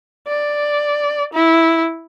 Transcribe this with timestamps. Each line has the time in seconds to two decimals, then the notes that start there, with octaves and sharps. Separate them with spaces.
0.28 D5
1.34 E4